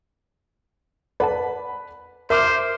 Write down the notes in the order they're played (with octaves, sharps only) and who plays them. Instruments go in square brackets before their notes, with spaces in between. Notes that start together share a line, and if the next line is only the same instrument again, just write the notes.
[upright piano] B4 B5 [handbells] D5 F#5 A5
[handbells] A#4 [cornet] C5 [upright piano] E5 D6 F6